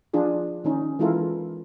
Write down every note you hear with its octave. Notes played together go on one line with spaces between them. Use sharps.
F3 D4 F4 G#4
D#3 C#4 D#4
E3 G#3 E4 F4 A4 A#4